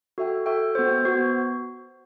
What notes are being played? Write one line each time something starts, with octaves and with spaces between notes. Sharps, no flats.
F#4 A4 E5 G5
F#4 A4 E5 G5
B3 F#4 C5
B3 F#4 C5